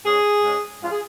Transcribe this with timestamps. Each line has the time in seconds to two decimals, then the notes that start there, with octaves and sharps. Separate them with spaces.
0.05 G#2 G#3 C#4 G#4
0.43 G#2 G#3 C#4
0.82 G#2 F3 C#4 F4
0.91 G#4